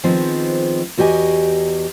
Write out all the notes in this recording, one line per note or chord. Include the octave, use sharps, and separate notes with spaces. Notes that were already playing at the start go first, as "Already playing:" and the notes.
D#3 F3 G#3 B3 C4
E2 F#4 G4 D#5 G#5